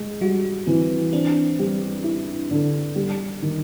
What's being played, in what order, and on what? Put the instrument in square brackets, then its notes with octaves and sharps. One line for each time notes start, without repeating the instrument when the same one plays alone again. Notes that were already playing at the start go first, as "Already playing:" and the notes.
Already playing: [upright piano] G#3
[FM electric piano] G3 [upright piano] F#4
[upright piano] E3 [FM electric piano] C4
[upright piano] C4 [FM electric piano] D4
[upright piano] G3
E4
D3
G3
D#3